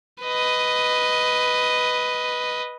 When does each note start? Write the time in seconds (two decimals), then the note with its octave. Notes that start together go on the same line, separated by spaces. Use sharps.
0.24 B4 D#5